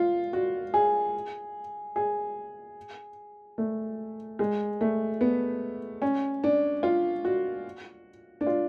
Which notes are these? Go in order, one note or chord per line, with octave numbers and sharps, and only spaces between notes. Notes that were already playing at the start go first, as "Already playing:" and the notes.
Already playing: F4
F#4
G#4
G#4
A3
G#3
A3
B3
C#4
D4
F4
F#4
D4
F4